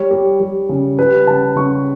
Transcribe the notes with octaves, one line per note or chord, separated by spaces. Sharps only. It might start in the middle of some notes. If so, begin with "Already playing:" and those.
Already playing: G3 C#5
G3
G3
C#3
G3 B4
C#3 A5
C#3 C#6